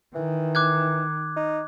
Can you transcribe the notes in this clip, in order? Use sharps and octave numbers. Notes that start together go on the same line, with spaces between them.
D#3 E3
D6 F#6 G#6
D#4